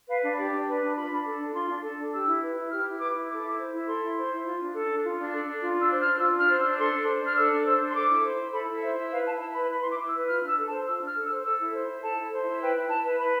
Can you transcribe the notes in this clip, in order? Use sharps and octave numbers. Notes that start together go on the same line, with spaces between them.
B4 F5
D4
G4 D5
D4
B4
D4
F4 B5
D4
A4
D4
F4 C6
D4
A4
D4
G4 E6
E4
B4
E4
G4 F6
E4
B4 D6
E4
A4 D6
E4
C5
E4
A4 C6
E4
C5
E4
F4
D4
A4
D4
F4
D4
A4
D4
F4
D4 E6
C5
F6
D4
F4 E6
D4 F6
C5
E6
D4
A4 C6
D4
C5
D4 F6
A4 E6
D4
C5 E6
D4
C6
A4 D6
E4
C5
E4
A4 B5
E4
C5 E5
E4
B4 F5
E4 A5
E4 A5
B4 B5
B4 B5
E4 C6
D6
E4
E6
B4
F4 F6
D4 E6
A4
A5
C5
F4 E6
D4
F6
A4
E6
C5
A4 E6
E4
C5
E4
A4 A5
E4
C5
E4
B4 G5
E4
E4 A5
B4
B4 B5